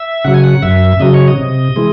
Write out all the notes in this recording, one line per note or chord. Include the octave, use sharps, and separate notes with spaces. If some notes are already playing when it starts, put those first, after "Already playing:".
Already playing: E5
C#3 F#3 F#5
G#5
F#5
F#2 E5
C#3 F#3 D#5
C#5
D#5
C3
E3 G#3